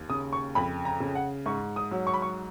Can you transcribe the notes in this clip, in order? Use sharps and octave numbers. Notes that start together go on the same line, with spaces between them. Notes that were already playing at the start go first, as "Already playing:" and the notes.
Already playing: D#2
C#3 D#6
C#6
F2 B5
A#5
C#3
F#5
G#2 C#6
D#6
F#3
C#6
B5
C#6